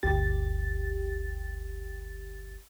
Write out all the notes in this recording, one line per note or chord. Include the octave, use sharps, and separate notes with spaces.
G1 D2 G4 A6